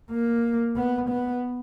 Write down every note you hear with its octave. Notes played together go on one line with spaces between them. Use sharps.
A#3
B3
B3